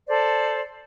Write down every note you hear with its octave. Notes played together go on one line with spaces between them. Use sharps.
A4 C5 D5